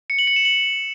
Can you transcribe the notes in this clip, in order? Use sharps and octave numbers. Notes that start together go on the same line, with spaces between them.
C#7
F#7
C#7
E7
F#7